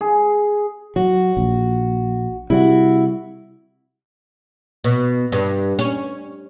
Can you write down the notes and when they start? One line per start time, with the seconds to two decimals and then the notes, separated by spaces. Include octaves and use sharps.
0.01 G#4
0.96 F#3 F#4
1.37 A#1
2.50 C3 G3 E4 F#4
4.84 B2
5.32 G2
5.79 C#4